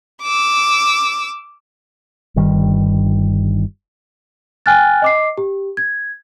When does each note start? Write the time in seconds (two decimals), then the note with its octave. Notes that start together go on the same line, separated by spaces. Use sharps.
0.23 D6 E6
2.36 G1 G2 D#3 G3
4.66 G5 G#5 F6 F#6 A6
5.02 D#5 D6 C7
5.38 G4
5.77 G#6